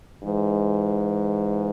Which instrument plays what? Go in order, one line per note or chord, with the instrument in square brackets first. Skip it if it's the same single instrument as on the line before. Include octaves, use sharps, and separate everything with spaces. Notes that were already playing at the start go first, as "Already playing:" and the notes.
[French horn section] G#2 E3 G#3